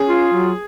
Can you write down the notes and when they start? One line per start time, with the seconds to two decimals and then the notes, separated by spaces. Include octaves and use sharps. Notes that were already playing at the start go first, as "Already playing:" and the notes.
Already playing: C#4 G#4
0.08 F4
0.33 F#3